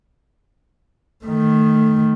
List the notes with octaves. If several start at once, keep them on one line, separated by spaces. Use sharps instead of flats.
D#3 A3